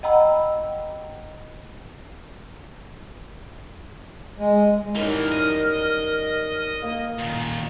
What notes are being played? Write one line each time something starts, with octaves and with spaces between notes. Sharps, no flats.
D#5 F#5 G5 A#5 B5 E6
G#3
F#2 A2 E3 G3 D#4 A#4
D#5
A#3
A#2 D#3